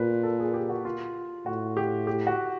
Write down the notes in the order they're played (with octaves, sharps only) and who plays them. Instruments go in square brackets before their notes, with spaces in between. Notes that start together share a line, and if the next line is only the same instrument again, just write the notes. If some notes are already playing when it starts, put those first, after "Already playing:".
Already playing: [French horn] A#2 [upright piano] B4
[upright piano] A#4
A4
G#4
G4
F#4
F4
[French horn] A2 [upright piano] F#4
[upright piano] G4
G4
F#4